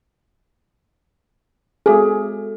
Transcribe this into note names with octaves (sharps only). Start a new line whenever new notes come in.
G#3 F#4 G#4 A4